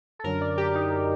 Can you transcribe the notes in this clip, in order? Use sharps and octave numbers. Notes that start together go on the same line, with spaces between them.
A4
F#2 D3 F#3 A#4
D5
G4
D#4